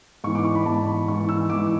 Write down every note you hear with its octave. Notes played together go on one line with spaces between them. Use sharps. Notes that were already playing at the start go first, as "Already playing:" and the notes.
G#2 E3 C#6
D6
C#6
B5
G#2 E3 A5
B5
G#2 E3 C#6
E6
G#2 E3 D6